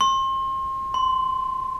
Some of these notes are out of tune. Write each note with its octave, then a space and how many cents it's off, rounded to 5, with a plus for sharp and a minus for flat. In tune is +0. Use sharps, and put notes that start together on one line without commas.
C6 +35
C6 -15